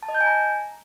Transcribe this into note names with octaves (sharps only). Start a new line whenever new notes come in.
A5
D#5
G6
G#5
A#5